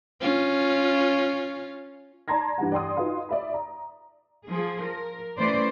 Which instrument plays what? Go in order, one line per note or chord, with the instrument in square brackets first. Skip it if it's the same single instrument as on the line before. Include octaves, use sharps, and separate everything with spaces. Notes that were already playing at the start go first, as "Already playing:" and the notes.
[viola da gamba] C#4 F4
[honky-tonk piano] D5 A5 A#5 C6 G#6 A#6
G2 E3 G3 F#5
D5 G5 C6 D#6
D#4 F4 F#4 B4 F5 C6
D5 E5 B5
A#5
[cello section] F3 G#4
A#4
E3 A3 C#4 B4 C5 D5